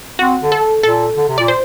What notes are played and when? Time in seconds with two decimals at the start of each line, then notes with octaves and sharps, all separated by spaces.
0.19 C4 F#4
0.41 D3
0.52 A4
0.83 A#2 A4
1.16 D3
1.28 C3
1.38 A#2 D5
1.48 C5